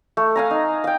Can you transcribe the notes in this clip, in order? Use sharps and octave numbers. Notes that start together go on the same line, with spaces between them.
A3
F5 G#5 A#5
D#4
F5 G5